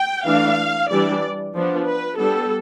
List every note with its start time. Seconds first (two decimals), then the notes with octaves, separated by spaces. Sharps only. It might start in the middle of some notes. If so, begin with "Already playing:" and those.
Already playing: G5
0.25 E3 A3 D4 F5
0.89 E3 G3 D4 D5
1.54 F3 B3 D4
1.86 B4
2.17 G3 B3 D4 A4